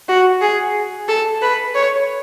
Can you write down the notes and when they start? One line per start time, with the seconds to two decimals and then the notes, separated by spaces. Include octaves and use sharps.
0.09 F#4
0.41 G#4
1.08 A4
1.42 B4
1.74 C#5